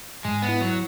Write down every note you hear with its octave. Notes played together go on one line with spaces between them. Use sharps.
G#2 G#3
B3
E4
F#3